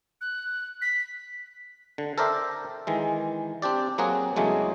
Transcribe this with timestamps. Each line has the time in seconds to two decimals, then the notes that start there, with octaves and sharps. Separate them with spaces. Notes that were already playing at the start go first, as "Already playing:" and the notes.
0.21 F#6
0.82 B6
1.98 D3
2.18 A4 A#4 C5 D5 E5 G5
2.87 D#3 E3 G#3
3.62 C4 D4 G4 D5
3.98 F#3 A#3 C4 F#4 G#4
4.36 E2 C#3 F#3 G#3 A3